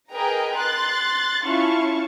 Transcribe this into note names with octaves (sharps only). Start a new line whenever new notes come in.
G#4 A#4 B4 D#5 G5 A#5
C6 F#6 A6
C#4 E4 F4 F5 A5 C#6